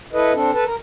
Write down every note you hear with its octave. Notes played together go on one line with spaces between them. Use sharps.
E4 A4 B4 D#5
C4 D4 A4
A4 B4 A5
A#4 A#5